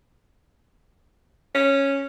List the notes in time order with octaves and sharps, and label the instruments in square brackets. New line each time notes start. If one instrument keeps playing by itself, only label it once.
[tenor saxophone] C#4